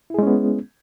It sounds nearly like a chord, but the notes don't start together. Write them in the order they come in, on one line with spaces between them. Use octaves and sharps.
E4 G#4 G#3 C#4 B3